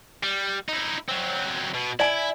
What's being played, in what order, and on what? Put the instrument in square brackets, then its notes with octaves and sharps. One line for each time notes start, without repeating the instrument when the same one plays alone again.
[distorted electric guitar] G3
D#4 E4
F#3 C4
B2
[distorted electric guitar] E4 [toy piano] D5 G#5